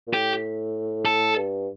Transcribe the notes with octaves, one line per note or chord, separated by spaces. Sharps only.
A#2
A2 G4
A4
G2